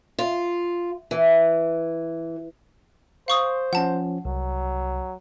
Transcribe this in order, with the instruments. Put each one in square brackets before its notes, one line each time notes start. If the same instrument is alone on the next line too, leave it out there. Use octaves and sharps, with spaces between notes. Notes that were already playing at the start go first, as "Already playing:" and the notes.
[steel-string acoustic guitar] F4
E3
[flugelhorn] C5 [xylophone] F5 C#6 D#6
[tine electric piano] F3 C#4 [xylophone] F#5 A5
[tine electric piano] C2 [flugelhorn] F#3